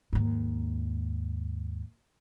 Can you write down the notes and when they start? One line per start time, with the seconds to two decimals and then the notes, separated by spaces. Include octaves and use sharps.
0.13 D#2 G#2